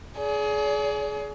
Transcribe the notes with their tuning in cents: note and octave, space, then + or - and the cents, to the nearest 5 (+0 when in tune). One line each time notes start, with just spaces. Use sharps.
G#4 +25 D5 -35